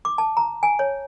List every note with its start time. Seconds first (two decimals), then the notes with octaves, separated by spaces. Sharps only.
0.05 D6
0.18 A5
0.37 A#5
0.63 G#5
0.79 C#5